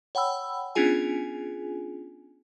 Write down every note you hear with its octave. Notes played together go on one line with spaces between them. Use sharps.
C#5 F#5 G5 B5 E6
B3 C#4 D4 F4 G#4 G#5